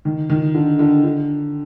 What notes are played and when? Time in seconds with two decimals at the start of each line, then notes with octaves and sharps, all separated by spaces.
0.05 D#3
0.30 D#3
0.54 D3
0.79 D3
1.04 D3